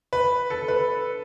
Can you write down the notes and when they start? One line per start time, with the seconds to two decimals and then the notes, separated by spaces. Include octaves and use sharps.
0.13 B4
0.50 A4
0.68 B4